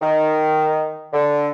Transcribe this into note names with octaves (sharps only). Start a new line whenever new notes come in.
D#3
D3